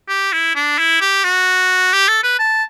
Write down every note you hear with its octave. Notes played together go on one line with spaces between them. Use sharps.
G4
E4
D4
E4
G4
F#4
G4
A4
B4
A5